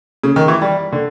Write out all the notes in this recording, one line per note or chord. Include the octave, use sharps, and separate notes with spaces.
C#3
D#3
E3
G3
D3